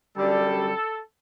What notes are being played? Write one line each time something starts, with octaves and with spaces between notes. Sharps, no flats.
F#2 D3 G3 A4